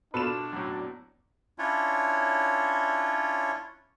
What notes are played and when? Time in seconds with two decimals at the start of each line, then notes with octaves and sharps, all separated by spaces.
0.14 B2 D4 F4 A4 B4 E7
0.53 F#2 A2
1.59 C#4 D4 E4 F4 C#5